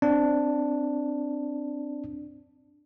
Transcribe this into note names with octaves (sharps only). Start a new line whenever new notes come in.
C4 D4